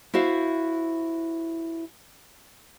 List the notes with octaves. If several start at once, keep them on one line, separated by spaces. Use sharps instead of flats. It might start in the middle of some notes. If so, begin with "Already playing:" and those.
E4 F#4 C5 E5 F5